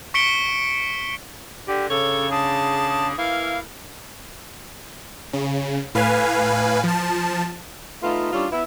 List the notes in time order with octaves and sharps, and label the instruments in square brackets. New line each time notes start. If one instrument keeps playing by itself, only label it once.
[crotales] C#6 B6 C#7 D7 G7
[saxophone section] D3 [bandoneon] G4
[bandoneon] C#3 [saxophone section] D4 C#5 [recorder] A4
[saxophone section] D3 G#4 [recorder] A5
[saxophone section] E3 A#3 E4 [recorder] F5
[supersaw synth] C#3
A2 B4 F5 G#5
F3 A5
[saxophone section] A3 B3 D#4 F4
G3 C#4 D4 E4 F4
B3 E4